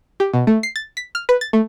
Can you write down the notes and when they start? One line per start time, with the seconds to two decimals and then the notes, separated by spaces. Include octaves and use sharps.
0.20 G4
0.33 B2
0.47 A3
0.63 C7
0.76 A6
0.97 B6
1.15 F6
1.29 B4
1.41 A6
1.53 A3